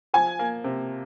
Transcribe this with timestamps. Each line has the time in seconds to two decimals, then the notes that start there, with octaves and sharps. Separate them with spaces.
0.14 F3 G#5
0.39 A#3
0.64 C3